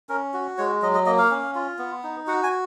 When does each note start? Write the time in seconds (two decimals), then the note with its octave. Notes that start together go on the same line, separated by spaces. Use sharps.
0.09 C#4 A#4
0.34 F#4
0.58 G#3 C#5
0.82 F#3 D#5
0.94 D#5
1.06 A#3 D#5
1.18 F5
1.31 C#4
1.55 F4
1.79 B3
2.04 D#4
2.27 F#4 F#5
2.43 G#5